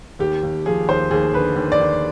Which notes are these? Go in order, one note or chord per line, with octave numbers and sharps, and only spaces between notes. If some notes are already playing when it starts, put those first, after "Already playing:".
D#2 G4
D#2
F3 G#4
D#2 C5
D#2 G#4
D3 B4
D#2
D5
D#2